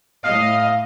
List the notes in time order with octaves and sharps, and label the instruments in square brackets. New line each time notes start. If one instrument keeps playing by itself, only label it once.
[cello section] A2 D#5 [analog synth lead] F5